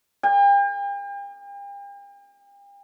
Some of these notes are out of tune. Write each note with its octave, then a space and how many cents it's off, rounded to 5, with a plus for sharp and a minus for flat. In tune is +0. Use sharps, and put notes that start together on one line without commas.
G5 +40